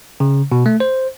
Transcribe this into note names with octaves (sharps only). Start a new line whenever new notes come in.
C#3
B2
A3
C5